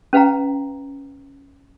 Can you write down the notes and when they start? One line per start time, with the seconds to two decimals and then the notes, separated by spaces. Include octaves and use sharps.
0.13 C#4 B4 F5 G5 A#5